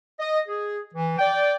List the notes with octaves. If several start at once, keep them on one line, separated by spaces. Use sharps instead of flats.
D#5
G#4
E3
D5 G5